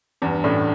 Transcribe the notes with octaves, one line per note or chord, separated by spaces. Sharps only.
E2 G2 D4
F#2 A2 D5